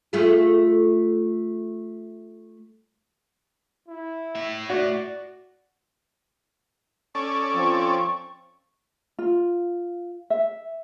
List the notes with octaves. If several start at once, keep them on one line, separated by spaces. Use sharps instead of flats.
A3 F4 G#4
E4
A2 E5
F#4 D5
C#4 A4 D5 C#6
F3 C4
F4
E5